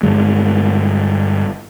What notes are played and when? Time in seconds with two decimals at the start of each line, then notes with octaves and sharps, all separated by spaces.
0.03 G1 G#3